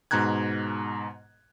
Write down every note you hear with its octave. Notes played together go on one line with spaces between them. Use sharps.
G#2 B2 A#5 F#6 G#6